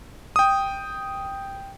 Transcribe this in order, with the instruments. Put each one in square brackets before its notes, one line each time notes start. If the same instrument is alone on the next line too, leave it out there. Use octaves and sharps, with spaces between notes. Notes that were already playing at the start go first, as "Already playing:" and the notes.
[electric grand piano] G5 D#6